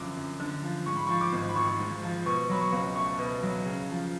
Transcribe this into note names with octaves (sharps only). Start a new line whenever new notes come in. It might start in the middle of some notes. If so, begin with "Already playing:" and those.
Already playing: F#2 D3 F3 D6
F#2
D3
F3
G#2 C#6
B5
F3 C#6
D6
G#1
B5
G#1 C#6
G#2
F3
B2 C#6
F#3 B5
C#6
C#2
A3 C#6
B2
F#3
C#3
F3